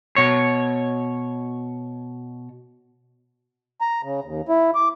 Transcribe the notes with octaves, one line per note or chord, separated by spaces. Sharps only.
B2 C#5
A#5
C#3
D#2
E4
D6